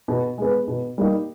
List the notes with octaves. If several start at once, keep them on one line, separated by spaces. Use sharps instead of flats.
B2
G#3 B3
B2
G3 A#3 D#4